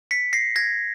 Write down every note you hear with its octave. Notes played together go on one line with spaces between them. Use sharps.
B6 C#7
A#6 C7
G#6 A#6